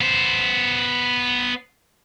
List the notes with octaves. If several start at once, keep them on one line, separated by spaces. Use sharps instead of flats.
B3 C5